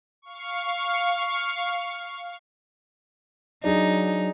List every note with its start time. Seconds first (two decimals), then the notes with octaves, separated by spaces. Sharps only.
0.22 F5 C#6
3.64 F#3 D4 D#4 G#4